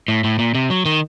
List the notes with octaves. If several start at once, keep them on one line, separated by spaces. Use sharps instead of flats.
A2
A2
A#2
C3
F#3
D#3